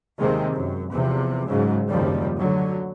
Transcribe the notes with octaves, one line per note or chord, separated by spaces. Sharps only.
D#2 C3 D#3 G#3 C4
F#2
E2 C3 F3
G#2 C#3 F#3
F#1 D#2 C3 F3 G3
D2 D3 F#3